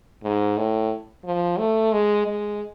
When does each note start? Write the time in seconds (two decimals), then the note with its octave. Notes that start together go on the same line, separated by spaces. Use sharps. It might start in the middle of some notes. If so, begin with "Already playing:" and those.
0.23 G#2
0.57 A2
1.25 F3
1.59 A3
1.93 G#3
2.27 G#3